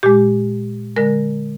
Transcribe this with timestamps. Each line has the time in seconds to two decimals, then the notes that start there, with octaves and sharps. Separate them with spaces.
0.03 A#2 G#3 G4
0.97 D3 G#3 A#4